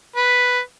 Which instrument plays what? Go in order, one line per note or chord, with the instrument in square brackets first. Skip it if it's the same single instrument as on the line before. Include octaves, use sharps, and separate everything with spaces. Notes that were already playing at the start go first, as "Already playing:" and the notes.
[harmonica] B4